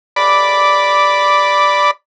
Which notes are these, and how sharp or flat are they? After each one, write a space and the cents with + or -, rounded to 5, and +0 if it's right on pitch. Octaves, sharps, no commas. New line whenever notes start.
D5 +0 B5 +0 D6 -5